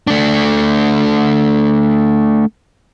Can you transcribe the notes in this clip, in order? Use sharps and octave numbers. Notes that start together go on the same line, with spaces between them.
A3 D4